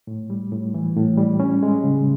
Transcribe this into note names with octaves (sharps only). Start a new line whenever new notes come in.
A2
G3
A2
E3
A2
G3
C#4
G#3
C#3